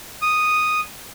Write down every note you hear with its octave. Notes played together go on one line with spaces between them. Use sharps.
D#6